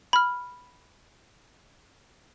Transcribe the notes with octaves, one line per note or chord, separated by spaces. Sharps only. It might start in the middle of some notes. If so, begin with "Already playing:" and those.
B5 F6